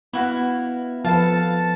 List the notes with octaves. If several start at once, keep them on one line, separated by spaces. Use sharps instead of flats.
B3 E4 F#4 F5
F3 A4 B4 F5 A5